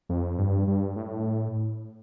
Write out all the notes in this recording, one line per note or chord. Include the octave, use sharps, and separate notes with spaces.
F2
G2
G2
A2